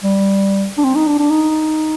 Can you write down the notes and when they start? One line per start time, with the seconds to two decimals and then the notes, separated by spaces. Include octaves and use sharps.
0.03 G3
0.78 D4
0.84 C4
0.95 D#4
1.07 D4
1.19 D4
1.31 D#4